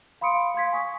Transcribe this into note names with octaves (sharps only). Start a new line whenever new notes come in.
F5 B5 C6 D#6 C#7 D7
F5 C6 G#6 B6
G#5 C#6 D#6 B6